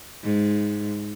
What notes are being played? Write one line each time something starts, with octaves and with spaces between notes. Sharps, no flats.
G#2